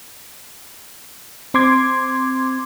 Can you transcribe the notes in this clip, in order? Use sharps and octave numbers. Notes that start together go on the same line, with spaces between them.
C4 C6 D6 G#6